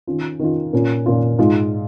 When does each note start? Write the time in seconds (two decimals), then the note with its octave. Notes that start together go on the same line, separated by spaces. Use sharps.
0.07 D#3 C#4 F4
0.40 D#3 C#4 F4
0.73 A#2 A#3 C#4 F4
1.06 A#2 A#3 C#4 F4
1.38 G#2 G#3 F4